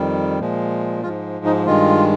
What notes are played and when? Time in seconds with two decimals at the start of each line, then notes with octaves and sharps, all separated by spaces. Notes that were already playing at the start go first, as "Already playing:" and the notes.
Already playing: F2 D#3 G3
0.40 A#2 F3 G#3
1.03 G#2 F3 G#3 F4
1.46 D#4
1.67 G2 D#3 G#3 F4